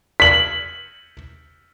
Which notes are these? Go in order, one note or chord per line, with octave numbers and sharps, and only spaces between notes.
B6 F#7